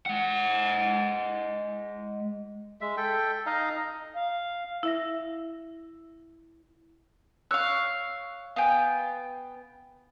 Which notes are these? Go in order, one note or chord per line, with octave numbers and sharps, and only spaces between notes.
G#3 F#5
G#3 E5
A4 G5
D#4 D#5 F5 A#5
F5
E4 E5 A#6
C#5 F5 E6 F#6
B3 F5 G5 G#5